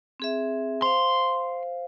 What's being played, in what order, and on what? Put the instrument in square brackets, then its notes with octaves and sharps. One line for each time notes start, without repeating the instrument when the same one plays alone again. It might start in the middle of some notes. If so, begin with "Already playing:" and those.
[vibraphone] C4 G#4 E5
[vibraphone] C5 F5 [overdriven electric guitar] C6